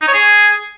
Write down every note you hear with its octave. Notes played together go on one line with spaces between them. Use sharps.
D#4
C#5
G#4